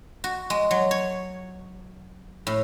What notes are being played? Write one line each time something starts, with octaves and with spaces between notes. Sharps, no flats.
F#4
G#3
F#3
C#5
A2